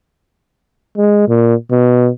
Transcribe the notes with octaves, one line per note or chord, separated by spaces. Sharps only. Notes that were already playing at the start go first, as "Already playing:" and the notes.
G#3
A#2
B2